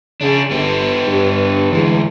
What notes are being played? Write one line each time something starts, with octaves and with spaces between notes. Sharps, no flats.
C#3 D4 G#4
G1 B3 G4
G2
D2 E3 G#3